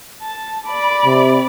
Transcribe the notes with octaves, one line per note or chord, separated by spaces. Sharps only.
A5
D5 B5
C3